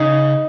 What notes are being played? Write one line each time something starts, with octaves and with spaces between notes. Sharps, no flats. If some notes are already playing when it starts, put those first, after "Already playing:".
Already playing: C#3 D#4